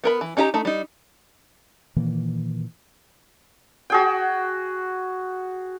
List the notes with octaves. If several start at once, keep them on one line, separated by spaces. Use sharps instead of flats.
B3 A#4 B5
E3
C#4 D#4 G4 E5 A#5
A3 D#4
G3 D#4
A#2 D#3 E3 A#3
F#4 G#4 G5